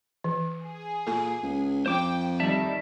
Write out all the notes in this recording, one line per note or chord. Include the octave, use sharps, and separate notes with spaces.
E3
G#4
A#2 A4 G#5
C#2
F2 C5 G5 D6
D#3 G3 D5 E5 A5